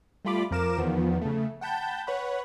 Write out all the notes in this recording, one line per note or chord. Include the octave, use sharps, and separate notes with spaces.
G3 A3 F4 B5 D6
F2 F3 A#4 D6 E7
E2 D#3 F3 B3
C#3 A3
F#5 G5 A5 B5 G6
B4 C#5 F#5 B5